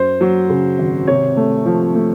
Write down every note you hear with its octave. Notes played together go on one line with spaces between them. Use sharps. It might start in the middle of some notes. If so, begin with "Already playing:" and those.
Already playing: F#2 C5
F#3
C#3
G#1
C3 C#5
A3
F3
A3